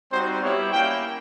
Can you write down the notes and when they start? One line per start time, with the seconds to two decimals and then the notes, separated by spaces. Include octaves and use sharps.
0.10 G3 C4 D#4 F#4 C5
0.41 G3 B3 E4 G4 C#5
0.72 A#3 C#4 E4 G5